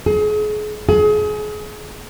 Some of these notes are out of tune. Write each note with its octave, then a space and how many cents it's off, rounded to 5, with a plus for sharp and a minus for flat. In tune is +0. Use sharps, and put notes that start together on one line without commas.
G#4 +35
G#4 +30